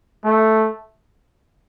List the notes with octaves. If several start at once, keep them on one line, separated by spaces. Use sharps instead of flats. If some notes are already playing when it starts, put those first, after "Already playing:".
A3